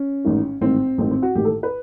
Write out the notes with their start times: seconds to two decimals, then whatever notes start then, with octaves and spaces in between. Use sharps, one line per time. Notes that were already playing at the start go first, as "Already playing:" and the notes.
Already playing: C#4
0.24 A1 G#2 D#3
0.61 A1 G#2 D#3 C4
0.98 A1 G#2 D#3 C4
1.11 C4
1.22 F#4
1.35 A1 G#2 D#3 G4
1.45 A4
1.63 B4